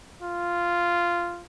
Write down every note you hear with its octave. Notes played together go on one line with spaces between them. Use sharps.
F4